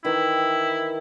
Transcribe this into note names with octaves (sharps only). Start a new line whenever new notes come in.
D#3 E3 E4 G5